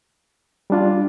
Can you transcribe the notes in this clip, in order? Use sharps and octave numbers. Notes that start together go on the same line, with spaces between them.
G3 D4 F4